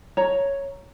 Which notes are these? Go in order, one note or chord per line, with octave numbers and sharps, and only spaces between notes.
C#5 A#5